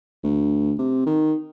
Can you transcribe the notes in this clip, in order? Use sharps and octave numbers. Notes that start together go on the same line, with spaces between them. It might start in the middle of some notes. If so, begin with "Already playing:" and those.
D2
C3
D#3